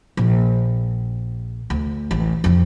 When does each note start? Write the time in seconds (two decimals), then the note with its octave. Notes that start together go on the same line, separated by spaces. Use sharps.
0.17 A#1
1.70 D2
2.11 A1
2.44 F2 D3